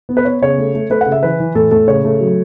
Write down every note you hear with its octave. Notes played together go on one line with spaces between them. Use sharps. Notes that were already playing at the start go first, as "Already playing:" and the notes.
B3
B4
B3 C#5
C#3 C#5
A3
A3
A3 B4
F#5
C#3
E5
E3 B4
E3
A2 A4
A2 A4
C#3 C#5
A3
F#3